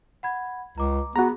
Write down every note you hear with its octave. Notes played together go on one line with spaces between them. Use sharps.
F#5 B5 G#6
C#2 A#5 D6
B3 F#4 G#4 A#5